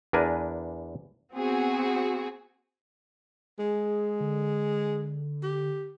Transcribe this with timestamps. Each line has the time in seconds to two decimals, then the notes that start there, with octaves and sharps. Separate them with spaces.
0.13 E2 D4 A#4 B4 G#5
1.34 B3 C4 F#4 G#4
3.58 G#3 G#4
4.20 D3
5.43 G4